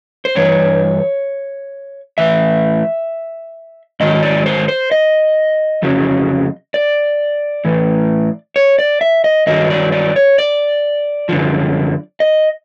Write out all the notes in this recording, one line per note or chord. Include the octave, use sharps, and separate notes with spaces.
C5
G2 E3 C#5
A2 E3 E5
G#2 D#3 F#3 D#5
D5
C5
C5
D#5
F2 C#3 F#3
D5
A2 E3
C#5
D5
E5
D#5
G2 D#3 F#3 D#5
D5
D5
C#5
D5
F#2 D3 F3
D#5